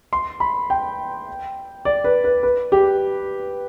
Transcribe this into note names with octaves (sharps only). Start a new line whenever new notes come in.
C6
B5
G5
D5
B4
B4
B4
G4